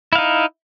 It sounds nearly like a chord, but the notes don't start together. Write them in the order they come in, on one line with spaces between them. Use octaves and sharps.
E4 F5 D#4